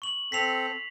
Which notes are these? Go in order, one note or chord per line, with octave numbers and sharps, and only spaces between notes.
C#6 F#7
C4 A4 B6 C7 F7